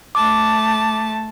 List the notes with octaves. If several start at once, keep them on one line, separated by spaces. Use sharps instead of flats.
A3 A5 D6